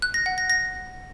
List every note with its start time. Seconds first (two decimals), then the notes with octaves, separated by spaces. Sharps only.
0.02 F#6
0.14 A#6
0.26 F#5
0.38 A#6
0.50 A#6